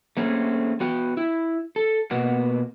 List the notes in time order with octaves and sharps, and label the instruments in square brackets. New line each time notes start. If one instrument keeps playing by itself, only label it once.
[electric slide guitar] A3 A#3 C4 C#4 F#4 G#4
B3 F#4 G5
E4
A4
B2 A#3 B3 F#4